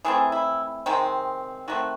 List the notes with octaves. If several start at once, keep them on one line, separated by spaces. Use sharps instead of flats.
E3 A3 C4 G#4
E4
C3 D#3 G#3 C4
D#3 A3 C4 F#4